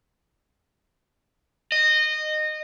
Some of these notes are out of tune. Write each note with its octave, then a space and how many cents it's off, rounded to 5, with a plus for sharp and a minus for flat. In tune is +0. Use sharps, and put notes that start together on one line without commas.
D#5 -20